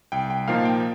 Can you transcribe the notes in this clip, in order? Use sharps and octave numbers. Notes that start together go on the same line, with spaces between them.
C2 G5
G5
A#2 F3 A#3 D#4 F5
G5